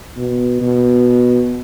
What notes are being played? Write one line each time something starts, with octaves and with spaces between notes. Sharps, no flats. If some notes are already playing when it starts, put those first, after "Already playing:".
B2
B2